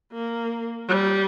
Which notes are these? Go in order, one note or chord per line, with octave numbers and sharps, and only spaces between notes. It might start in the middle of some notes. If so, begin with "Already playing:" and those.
A#3
G3